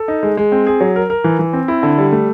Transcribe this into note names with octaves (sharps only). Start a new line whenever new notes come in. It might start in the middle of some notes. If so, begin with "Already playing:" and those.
Already playing: A4
D#4
G#3
G#3
C4
G#4
F#3
A#4
A#4
E3
E3
C4
E4
D3
G3
A3